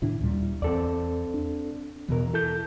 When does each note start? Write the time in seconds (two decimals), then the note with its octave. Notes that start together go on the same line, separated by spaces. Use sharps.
0.02 A2 D#3 D4 E4
0.21 D#2 A#2 G3
0.62 E2 C4 A4 D5
1.34 D4
2.08 E2 B2 E3 A#4
2.33 E4 A4 G6